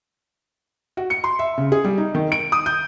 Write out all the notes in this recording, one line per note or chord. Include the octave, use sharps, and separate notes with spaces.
F#4
C#7
C6
E5
C#3
G#4
G3
D#4
D#3
D7
D#6
G6